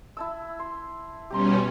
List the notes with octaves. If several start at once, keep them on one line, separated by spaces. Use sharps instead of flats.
E4 A5 E6
C6
B2 G3 C#4 G4 A#5 C6